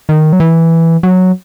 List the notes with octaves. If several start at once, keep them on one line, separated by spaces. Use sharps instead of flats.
D#3
F#3
E3
F#3